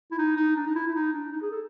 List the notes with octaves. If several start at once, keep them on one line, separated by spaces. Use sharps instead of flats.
E4
D#4
D#4
D4
D#4
E4
E4
D#4
D4
D#4
G#4
A4